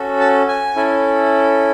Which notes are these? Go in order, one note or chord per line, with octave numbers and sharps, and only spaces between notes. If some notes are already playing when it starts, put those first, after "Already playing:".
Already playing: C#4 F#4 A4
A5
G#5
C#4 E4 A4